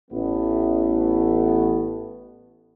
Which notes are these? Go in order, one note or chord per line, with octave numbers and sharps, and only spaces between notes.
A1 A3 B3